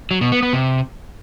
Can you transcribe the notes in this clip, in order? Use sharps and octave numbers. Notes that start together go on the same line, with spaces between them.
F#3
B2
B3
B3
C3